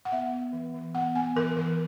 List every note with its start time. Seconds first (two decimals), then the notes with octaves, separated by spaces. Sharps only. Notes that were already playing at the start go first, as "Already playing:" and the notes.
0.05 F#5
0.12 B3 E5
0.32 B3
0.53 E3
0.74 E3
0.95 B3 F#5
1.15 B3 G#5
1.36 E3 A#4
1.57 E3 A#4